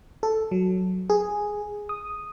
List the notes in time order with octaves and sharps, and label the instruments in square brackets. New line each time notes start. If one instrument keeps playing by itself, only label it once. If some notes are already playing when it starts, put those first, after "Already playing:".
[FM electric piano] A4
F#3
G#4
D#6